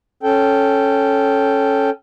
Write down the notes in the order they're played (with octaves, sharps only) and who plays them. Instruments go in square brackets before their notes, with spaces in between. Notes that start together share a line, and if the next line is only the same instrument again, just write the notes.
[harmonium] C#4 A4 G5